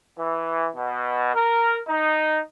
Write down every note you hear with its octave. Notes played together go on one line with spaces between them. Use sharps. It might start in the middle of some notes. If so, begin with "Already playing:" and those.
E3
B2
A#4
D#4